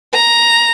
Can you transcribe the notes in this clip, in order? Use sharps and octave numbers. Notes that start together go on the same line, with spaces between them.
A#5